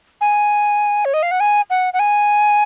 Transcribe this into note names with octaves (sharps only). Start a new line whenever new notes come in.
G#5
C#5
D#5
F5
F#5
G#5
F#5
F#5
G#5